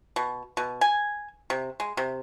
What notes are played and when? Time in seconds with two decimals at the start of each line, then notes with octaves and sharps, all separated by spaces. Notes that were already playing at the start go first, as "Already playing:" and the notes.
0.16 B2
0.57 B2
0.81 G#5
1.50 C3
1.80 G#3
1.97 C3